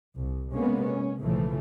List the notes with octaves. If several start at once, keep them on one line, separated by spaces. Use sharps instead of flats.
C2
C3 G#3 A#3 B3 C#4
C#4
B1 A2 C#3 E3 F3 A3